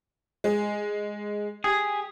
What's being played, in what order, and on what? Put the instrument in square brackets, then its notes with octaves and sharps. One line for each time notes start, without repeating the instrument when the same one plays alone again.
[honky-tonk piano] G#3
[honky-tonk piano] G4 [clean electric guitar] G#4